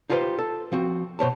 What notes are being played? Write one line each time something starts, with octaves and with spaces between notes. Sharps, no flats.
D#4 F4 G4 G#4 B4 C5
A4
F3 C4 F#4
B2 C5 C#5 A5